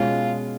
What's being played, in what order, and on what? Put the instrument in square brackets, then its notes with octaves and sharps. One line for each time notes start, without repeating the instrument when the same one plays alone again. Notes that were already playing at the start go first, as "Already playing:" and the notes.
Already playing: [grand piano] B2 G#3 C#4 [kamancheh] F4